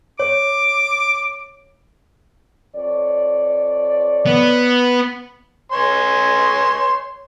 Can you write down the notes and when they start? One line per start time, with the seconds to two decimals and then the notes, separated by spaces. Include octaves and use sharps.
0.20 C#5 D6
2.75 F2 C#5 D5
4.26 B3
5.72 C#5 G#5 C6